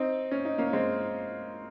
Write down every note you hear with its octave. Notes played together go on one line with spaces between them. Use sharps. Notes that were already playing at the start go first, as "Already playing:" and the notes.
Already playing: C4 D#4
C#4
D#4
A#3 C#4
G#3 C4